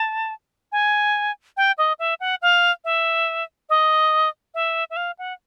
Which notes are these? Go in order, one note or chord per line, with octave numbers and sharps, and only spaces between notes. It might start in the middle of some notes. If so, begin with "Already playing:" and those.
Already playing: A5
G#5
G5
D#5
E5
F#5
F5
E5
D#5
E5
E5
F5
F#5